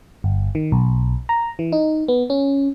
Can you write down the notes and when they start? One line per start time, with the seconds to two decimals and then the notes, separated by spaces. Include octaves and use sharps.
0.24 G1
0.55 D#3
0.72 B1
1.29 A#5
1.59 E3
1.72 D#4
2.08 B3
2.30 C#4